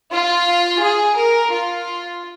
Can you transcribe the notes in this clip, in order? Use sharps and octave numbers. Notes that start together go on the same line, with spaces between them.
F4
G#4
A#4
F4